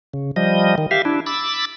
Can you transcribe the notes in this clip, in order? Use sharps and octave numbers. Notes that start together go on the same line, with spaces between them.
C#3
F3 G3 D#5
D#3
G4 E5 F5
D4 E4
B5 D6 E6 A6